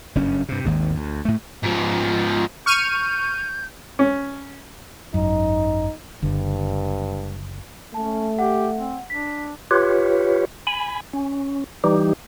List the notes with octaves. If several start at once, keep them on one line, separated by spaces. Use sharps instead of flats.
F#1 G2 C#4
G2 C3
G#1 D#2 G#2
D2
A2 A3
G#2 F3
C#6 F6 G6 D#7
C#4
G#1 F#2 D#4
F#1 G2 D3
A3 C#4 A5
G4 F#5
C4
D4 B6
F4 G4 B4 C#5
G#5 B5
C#4
E3 G3 D#4 G4